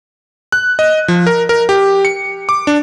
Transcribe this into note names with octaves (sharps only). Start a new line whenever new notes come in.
F#6
D#5
F3
A#4
A#4
G4
C#7
D6
D4